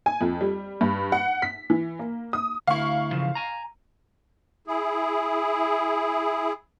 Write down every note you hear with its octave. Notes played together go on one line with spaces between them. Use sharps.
G#5
F2
G3
G2
F#5
B6
E3
A#3
D#6
D2 E4 F5 C#6
C#3 E3 F3
G#5 A#5
E4 G#4